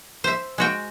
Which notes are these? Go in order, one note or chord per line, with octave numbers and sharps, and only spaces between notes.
C5 E5
G#3 F#4 G5